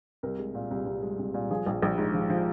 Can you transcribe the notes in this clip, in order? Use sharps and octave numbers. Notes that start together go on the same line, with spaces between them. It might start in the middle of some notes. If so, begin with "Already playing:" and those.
C2 A#4
G#3
A#2
C2
C2
G#3
C2
A#2
F3 G#4
A#1
A#1
G#2
F3
F3